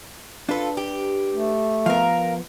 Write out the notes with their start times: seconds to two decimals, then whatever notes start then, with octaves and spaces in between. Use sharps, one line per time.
0.49 D4 F4 A4 B4
0.77 G4
1.31 A3
1.86 F3 B3 A#4 F5